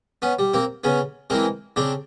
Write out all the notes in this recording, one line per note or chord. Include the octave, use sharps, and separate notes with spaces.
B3 C#4
G3
A#3 C4
C#3 B3 C#4
E3 G#3 A#3 C4
C#3 C4 D4